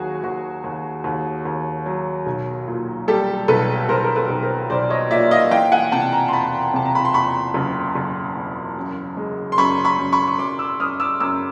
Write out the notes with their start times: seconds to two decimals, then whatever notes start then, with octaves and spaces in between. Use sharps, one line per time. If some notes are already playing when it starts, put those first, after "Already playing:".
Already playing: D#2 F#3 F#4 G#4
0.23 D#2 F#4
0.64 D#2
1.04 D#2
1.45 D#2
1.86 F#3
2.26 B1
2.67 A#2
3.08 G3 G4 A4
3.48 B1 A4 B4
3.89 B1 A#4 C5
4.04 A#4
4.16 A4 B4
4.29 B1
4.43 A#4 C5
4.70 B1 C5 D5
4.90 C#5 D#5
5.11 A#2 D5 E5
5.31 D#5 F5
5.51 E3 F5 G5
5.72 F#5 G#5
5.92 C3 G5 A5
6.12 G#5 A#5
6.28 C6
6.33 E2 A5 B5
6.74 C3 A5
6.86 A#5
6.95 B5
7.05 C6
7.14 E2 B5 C#6
7.54 F#1
7.95 F#1
8.36 E2
8.77 F#2
9.17 G#3
9.52 C6
9.58 F#2 B5 C#6
9.84 B5 C#6
9.98 F#2
10.12 B5 C#6
10.28 C#6
10.39 F#2 C6 D6
10.59 D6 E6
10.80 F#2 D#6 F6
11.00 D6 E6
11.20 F#2 D6 E6